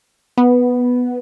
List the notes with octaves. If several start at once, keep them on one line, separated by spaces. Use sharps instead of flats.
B3